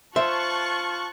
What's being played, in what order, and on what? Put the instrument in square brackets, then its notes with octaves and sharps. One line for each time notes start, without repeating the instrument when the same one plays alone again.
[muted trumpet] F4 [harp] C5 [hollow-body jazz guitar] E5 [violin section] A5 C#6 F#6